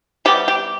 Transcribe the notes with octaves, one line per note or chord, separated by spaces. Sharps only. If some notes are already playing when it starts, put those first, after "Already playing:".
C3 G3 B3 G4
G4